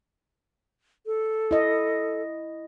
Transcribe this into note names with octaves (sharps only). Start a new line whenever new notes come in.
A4
E4 D#5